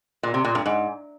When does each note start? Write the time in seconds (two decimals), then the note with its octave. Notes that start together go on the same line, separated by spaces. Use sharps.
0.23 A#2
0.34 C3
0.44 A#2
0.55 G2
0.66 G#2